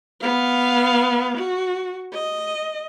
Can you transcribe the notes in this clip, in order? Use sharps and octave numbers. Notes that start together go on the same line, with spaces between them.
B3 F5
F#4
D#5